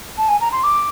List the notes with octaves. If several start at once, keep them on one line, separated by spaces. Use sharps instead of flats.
A5
G#5
A#5
C6
D6